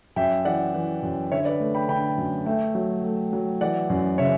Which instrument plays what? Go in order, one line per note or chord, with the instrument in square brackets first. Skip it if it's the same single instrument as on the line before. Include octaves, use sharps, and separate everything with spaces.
[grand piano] F#2 E5 G5
E3 D5 F#5
E3
F#2
D3 C#5 E5
B4 D5
A3
G5 B5
D3 G5 B5
F#2
A3 E5 G5
F#3
A3
F#3
E3 D5 F#5
F#2
C#3 C#5 E5